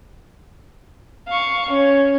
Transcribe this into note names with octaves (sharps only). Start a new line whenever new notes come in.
F5 C#6
C#4 C#5